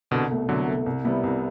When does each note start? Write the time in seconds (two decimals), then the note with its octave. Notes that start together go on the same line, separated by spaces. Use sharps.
0.11 C2 B2 D3
0.31 B2 A3
0.48 C2 D3 F#3
0.68 B2 A3
0.86 C2
1.05 C3 G3 B3 E4
1.23 C2